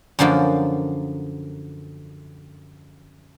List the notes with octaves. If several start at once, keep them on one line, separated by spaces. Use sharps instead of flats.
F#2 D3 F3 A#3